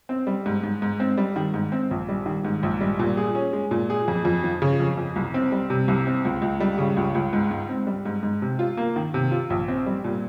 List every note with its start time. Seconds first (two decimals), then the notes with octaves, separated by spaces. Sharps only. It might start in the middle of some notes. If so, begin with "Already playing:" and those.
0.09 C4
0.27 G3
0.46 G#2
0.64 G#2
0.82 G#2
1.00 C4
1.17 G3
1.36 D#3
1.54 G#2
1.72 C4
1.91 A#1
2.09 G3
2.26 D#3
2.45 G#2
2.63 A#1
2.81 G3
2.99 A#2
3.17 G#4
3.35 C#4
3.53 G#3
3.71 A#2
3.90 G#4
4.08 F2
4.25 F2
4.44 F3
4.62 C#3
4.80 F2
4.97 F2
5.16 C2
5.34 C4
5.52 G3
5.70 C3
5.88 C2
6.07 C4
6.25 C#2
6.42 C#2
6.60 G3
6.78 C#3
6.97 C#2
7.15 C#2
7.33 G#2
7.51 G#2
7.69 C4
7.87 G3
8.06 G#2
8.23 G#2
8.42 C3
8.59 F4
8.77 A#3
8.96 D#3
9.14 C3
9.31 F4
9.50 A#1
9.68 C4
9.86 G3
10.04 A#2